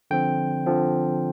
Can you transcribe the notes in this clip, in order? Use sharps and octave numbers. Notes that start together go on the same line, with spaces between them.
D3 F3 C4 G5
D3 F3 C4